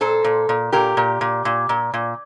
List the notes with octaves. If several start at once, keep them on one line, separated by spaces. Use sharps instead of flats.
A#2 A4 C5
A#2
A#2
A#2 G4 A#4
A#2
A#2
A#2
A#2
A#2